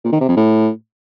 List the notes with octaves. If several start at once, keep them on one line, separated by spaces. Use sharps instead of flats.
A#2
D#3
C3
F2
A2